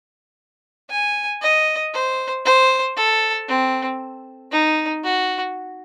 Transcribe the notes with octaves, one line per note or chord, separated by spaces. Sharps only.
G#5
D#5
C5
C5
A4
C4
D#4
F#4